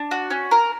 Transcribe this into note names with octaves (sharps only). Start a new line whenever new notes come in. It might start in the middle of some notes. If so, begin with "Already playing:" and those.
Already playing: D4
F#4
C#4
A#4